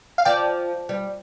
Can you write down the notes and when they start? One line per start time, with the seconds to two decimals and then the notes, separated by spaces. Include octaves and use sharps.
0.18 F5
0.25 F3 D5 G5
0.89 G3